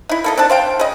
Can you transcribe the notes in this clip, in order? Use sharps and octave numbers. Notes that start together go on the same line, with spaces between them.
D#4 E4
A#3 A4 D#5
C4 D4 A5
C5 F5 G5
C#3 D#5